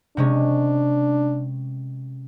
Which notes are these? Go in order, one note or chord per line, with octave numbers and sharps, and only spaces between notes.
C3 G#3 C#4 D4